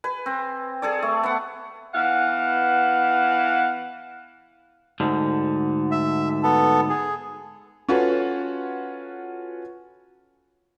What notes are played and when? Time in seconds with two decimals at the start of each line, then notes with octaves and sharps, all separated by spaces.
0.04 B4 G#5
0.26 C4
0.82 G#4 A4 D5
1.02 A3
1.23 B3 F#5
1.94 E3 B3 F5 F#5
5.00 D2 G#2 D3
5.91 E5
6.43 B3 A4
6.90 G#4
7.89 C#4 F4 F#4 A4 B4 C#5